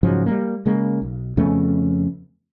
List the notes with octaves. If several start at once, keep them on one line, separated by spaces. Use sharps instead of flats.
G#2 C#3 F3 F#3
G3 A3 A#3
C#3 G#3 A#3
B1
F2 C#3 A3 B3